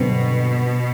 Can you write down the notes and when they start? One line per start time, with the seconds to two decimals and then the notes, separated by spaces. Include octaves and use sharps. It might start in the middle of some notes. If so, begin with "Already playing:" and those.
Already playing: G2 B2 D3 F#3 C4